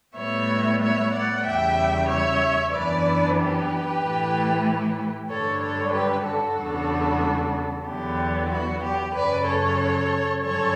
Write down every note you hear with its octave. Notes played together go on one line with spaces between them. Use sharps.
A2 G3 B3 C#5 E5
C#5 E5
D5 F#5
E2 C#3 G3 E5 G5
C#5 E5
F#2 E3 B3 D4 B4 D5
G4 B4
A2 E3 A3 E4
G2 D3 G3 D4 A4 C#5
A4 C#5
G4 B4
F#4 A4
E2 C#3 G3 B3 D4
E2 D3 F#3 B3 E4 G4
F#4
G4
F#2 C#3 F#3 B4 D5
A4 C#5
G2 D3 F#3 C#4 A4 C#5